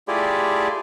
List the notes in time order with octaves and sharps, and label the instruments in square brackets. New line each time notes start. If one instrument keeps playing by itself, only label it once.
[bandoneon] A3 E4 F4 G4 G#4 D5